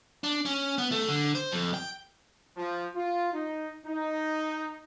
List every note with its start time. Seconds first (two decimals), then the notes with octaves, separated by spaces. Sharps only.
0.24 D4
0.45 C#4
0.78 B3
0.92 A3
1.08 D3
1.35 C5
1.52 F2
1.74 G5
2.57 F3
2.96 F4
3.33 D#4
3.87 D#4